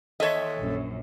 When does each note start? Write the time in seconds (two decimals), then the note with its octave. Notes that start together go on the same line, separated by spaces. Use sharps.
0.20 D#2 A4 C#5 D#5 E5
0.57 A#1 F#2